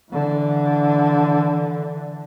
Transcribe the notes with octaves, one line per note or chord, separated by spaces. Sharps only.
D3 E3